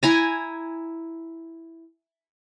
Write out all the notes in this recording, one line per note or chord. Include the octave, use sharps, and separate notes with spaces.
E4 G#5 A#5